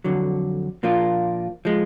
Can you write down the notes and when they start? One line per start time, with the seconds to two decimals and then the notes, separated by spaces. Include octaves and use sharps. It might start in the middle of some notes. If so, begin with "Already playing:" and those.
0.04 F2 D3 F#3
0.83 A#2 F3 A#3 D4 F4
1.65 F3 G#3